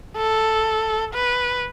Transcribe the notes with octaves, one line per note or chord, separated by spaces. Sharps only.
A4
B4